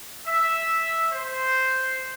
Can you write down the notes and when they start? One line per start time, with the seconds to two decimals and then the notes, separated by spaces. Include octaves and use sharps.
0.26 E5
1.12 C5